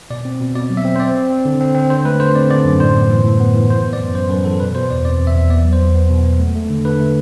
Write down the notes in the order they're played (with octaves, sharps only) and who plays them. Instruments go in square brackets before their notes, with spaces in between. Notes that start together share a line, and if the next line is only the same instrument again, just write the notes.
[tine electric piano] B2 D5
C4
B2
B2 D5
F#3
E5
C4
C5
C4 D5
C4
C4
D3
C4
C4
D3 C5
A3 B4
D3 C5
C4 D5
D3 D5
F#2
A2 C5
B3
E3
A2
B3
E3
E3 C5
B3
D5
F#2
F#2 C5
F#2 B4
E3 A4
B2 B4
B2 C5
E2 D5
C4 D5
E2
E5
E2
B3 D5
F#3
C5
E2
B3
B2
B3
A3
A3
D3
D3 B4
A3